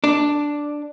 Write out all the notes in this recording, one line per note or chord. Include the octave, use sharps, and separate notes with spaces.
D4